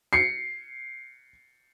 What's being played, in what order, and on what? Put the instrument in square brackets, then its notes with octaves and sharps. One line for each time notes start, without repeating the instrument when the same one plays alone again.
[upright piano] C7 C#7